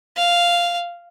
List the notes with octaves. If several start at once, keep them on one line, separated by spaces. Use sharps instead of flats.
F5